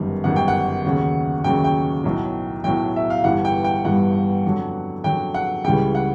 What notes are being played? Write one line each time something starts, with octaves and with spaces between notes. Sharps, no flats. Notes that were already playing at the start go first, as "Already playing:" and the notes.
Already playing: G1 F#2 D#3 G3
G1 F#2 D#3 G3 F#5
G5
F#5
D#2 C#3 F#3
D#2 C#3 F#3 G5
G5
B1 A2 F#3
B1 A2 F#3 G5
E5
F5
G1 G2 E3 G3 F#5
G5
G5
G1 G2 E3 G3 F#5
F2 D3 F#3
F2 D3 F#3 G5
F#5
C#2 C#3 E3 G3 G5
F#5